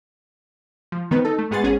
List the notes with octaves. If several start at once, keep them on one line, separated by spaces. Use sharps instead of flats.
F3
D#3 B3 C4 B4
D#4 A4
A3
G#2 B3 G#4 F#5 C6 A6
G#1 C#4 G#4